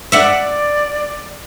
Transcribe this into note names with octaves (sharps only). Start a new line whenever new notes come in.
D5 E5 F#5